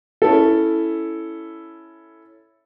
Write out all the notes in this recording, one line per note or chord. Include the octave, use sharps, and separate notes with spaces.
C#4 E4 A4